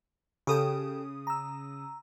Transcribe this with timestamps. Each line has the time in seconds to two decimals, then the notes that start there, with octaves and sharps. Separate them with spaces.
0.47 C#3 G4 A4 G5 D#6
1.27 A#5 E6